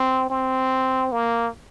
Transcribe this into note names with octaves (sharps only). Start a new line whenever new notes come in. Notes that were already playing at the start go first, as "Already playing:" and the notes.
Already playing: C4
C4
A#3